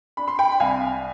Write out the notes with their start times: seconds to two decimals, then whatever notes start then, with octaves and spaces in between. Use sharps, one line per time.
0.17 D4 B5
0.28 C6
0.39 G5 B5
0.52 B5
0.60 C2 F5 G#5